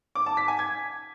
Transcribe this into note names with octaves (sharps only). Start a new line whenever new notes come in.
D6
A5
B6
G#5
G#6